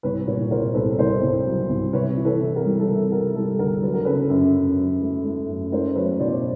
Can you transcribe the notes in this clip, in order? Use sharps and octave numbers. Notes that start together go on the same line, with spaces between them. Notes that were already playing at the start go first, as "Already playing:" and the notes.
C2 B4 C#5
A#2 B4 C#5
C2 A#4 C5
C2 A4 B4
C2 A#4 C5
C2
F#3
C2
C3 B4 C#5
E3
A4 B4
C3
A#4
G3
A4
C3 A#4
C3 A#4
G3 A4
D2 A#4
F#3 B4
A#4
C#3 A4 B4
F#2
F#2
F#3
A3
A3
F#2
A3 A#4 C5
F#3 B4 C#5
B2 C5 D5